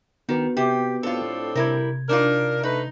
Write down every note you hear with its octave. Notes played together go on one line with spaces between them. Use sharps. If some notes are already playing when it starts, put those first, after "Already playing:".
D#3 B3 F#4 B4
C3 G4
A2 C4 D4 F4 A4
C3 G3 E4 A#4 G#6
D4 D#4 F4 A#4
A3 D#4 B4